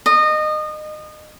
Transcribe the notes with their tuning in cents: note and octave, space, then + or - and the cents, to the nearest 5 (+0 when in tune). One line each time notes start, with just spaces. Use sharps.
D#5 -25